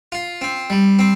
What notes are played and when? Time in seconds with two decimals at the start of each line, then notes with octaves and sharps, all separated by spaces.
0.12 F4
0.41 C4
0.70 G3
0.99 C4